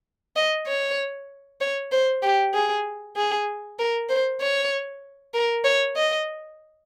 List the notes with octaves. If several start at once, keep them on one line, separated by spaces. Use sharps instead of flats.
D#5
C#5
C#5
C5
G4
G#4
G#4
A#4
C5
C#5
A#4
C#5
D#5